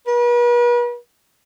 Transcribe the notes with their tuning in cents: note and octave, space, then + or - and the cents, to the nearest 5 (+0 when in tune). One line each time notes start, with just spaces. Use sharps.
B4 -40